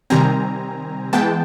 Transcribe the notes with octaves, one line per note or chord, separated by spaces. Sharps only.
C3 D#3 G3 C4 G#5 A#5
E3 G#3 B3 G5 A5